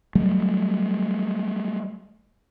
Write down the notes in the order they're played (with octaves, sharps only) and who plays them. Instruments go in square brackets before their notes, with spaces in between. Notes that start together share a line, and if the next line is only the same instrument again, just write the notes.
[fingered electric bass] F#3 G3 A3